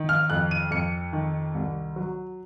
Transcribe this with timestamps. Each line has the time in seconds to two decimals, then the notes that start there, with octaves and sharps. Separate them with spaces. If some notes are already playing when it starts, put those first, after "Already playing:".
Already playing: D#3
0.09 F6
0.30 F2 F#6
0.51 D#7
0.71 F2 C#7
1.13 D#3
1.55 C2
1.96 F#3